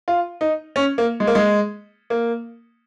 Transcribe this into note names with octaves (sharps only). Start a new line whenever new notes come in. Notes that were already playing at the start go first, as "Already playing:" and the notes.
F4
D#4
C#4
A#3
G#3
A#3
G#3
A#3